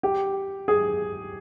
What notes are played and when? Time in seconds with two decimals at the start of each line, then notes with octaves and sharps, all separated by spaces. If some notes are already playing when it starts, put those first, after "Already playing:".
0.03 G4
0.68 G#4